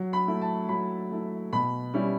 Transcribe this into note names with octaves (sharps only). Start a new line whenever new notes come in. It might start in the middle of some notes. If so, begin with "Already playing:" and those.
Already playing: F#3
B5
A3 E4
A5
F#3 B5
A3 E4
B2 B5
G3 C#4 E4